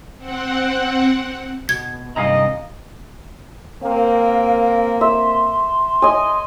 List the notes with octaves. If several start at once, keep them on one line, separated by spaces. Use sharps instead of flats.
C4 F#5
B2 G#6
G2 C3 D#3 D#5 F5 G#5 A#5
A#3 C4 A#4 F5
E5 C6
D#5 G#5